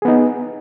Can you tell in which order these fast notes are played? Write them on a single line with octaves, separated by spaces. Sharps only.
G#4 B3 D#4